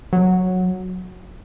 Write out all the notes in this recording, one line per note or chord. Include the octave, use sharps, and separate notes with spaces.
F#3